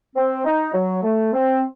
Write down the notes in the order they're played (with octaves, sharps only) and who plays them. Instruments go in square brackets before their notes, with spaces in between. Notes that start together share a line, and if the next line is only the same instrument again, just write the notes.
[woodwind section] C4
D#4
F#3
A3
C4